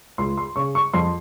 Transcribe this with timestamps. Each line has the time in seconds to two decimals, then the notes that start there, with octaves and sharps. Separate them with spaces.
0.18 C#2 C6
0.38 C6
0.56 C#3 C#6
0.75 C#6
0.94 F2 C6